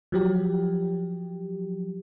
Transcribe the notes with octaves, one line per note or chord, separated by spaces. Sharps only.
F3 F#3 G4